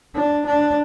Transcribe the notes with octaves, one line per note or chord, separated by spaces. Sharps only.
D4
D4